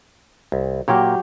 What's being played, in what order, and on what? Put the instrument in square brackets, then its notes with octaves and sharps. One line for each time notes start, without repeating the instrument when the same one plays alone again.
[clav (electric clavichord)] C2
[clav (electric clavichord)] A#2 A#3 [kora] F#3 G4 C#5